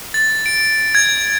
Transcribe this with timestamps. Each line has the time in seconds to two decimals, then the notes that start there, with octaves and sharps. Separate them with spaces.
0.14 A6
0.46 D7
0.95 G#6